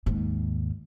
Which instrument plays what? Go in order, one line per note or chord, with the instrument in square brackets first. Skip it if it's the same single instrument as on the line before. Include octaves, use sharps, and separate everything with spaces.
[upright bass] D#2 G#2